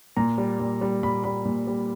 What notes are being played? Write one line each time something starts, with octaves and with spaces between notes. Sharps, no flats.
A#2 A#5
G3
A#2
G3
A#2 B5
G3 B5
A#2
G3